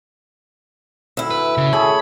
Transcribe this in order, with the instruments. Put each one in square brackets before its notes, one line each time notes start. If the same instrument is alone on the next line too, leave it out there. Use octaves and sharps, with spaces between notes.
[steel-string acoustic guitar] D2 E4
[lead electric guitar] B4
C#3
[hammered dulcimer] G#4 A4 C#5 [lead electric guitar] B5